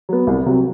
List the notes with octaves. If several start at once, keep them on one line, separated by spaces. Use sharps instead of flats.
F#3 B3
C2
C3 F#3